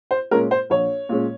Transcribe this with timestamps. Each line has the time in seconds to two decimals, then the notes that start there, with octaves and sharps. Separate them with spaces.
0.11 C5
0.31 A#2 G#3 C#4 A#4
0.51 C5
0.70 A#1 C#5
1.09 A#2 G#3 C#4